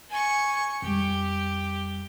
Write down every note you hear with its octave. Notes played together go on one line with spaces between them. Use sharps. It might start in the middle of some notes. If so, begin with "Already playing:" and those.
G#5 C#6
F2 G3 G4